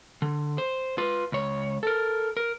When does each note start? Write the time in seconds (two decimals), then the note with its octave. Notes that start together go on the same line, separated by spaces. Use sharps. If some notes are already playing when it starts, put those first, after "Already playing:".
0.22 D3
0.58 C5
0.98 F4 B4
1.32 C#2 C#5
1.83 A4 A#4
2.37 A#4